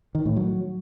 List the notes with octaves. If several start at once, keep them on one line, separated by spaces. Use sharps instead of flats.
D#3
A2
F#3